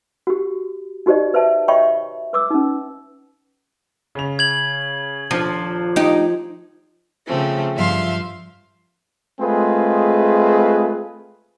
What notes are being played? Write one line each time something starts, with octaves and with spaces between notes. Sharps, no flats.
F#4 G4
D#4 F#4 G4 C5 D5 D#5
B4 C5 E5 A5
C#5 D#5 E5 G5 B5 C#6
B4 D6 E6
C#4 D#4
C#3 F7
G#6 F#7
D#1 F3 D4 C5
D#4 G4
C#3 F3 A3 C4
G2 F3 E5 F5 C6
G#3 A3 C4 F4 G#4 B4